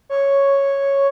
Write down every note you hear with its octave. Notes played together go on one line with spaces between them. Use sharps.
C#5